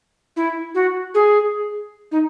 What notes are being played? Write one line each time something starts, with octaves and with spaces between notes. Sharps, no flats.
E4
F#4
G#4
D#4